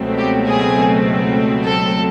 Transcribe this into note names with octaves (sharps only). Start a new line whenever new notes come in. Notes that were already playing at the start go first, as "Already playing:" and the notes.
Already playing: C#2 B2 F#3 A3 C4
G4
G#4
A4